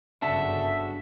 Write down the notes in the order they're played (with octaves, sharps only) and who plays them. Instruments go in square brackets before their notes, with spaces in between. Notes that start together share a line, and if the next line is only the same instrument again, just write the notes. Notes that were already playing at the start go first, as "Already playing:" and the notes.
[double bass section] G1 F#2 C#3 [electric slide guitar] D4 F#4 A4 [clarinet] E5 [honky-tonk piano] A5